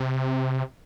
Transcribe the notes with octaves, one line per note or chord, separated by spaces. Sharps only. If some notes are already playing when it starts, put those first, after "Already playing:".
Already playing: C3